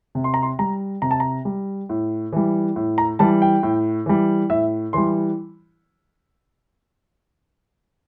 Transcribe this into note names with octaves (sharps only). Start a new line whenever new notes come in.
C3
C6
A#5
C6
G3 A#5
C3 A#5
A5
A#5
G3
A2
E3 G3
A2
A#5
E3 G3 A5
G5
A2
E3 G3
A2 E5
E3 G3 C6